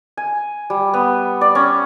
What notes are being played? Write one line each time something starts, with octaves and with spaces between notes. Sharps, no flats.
G#5
G3
B3
D5
C#4